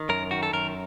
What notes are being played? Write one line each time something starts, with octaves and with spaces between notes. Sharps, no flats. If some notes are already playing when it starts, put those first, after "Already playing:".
Already playing: D#3
F#2 A#4
D#3 F#4
A4
F#2 A#4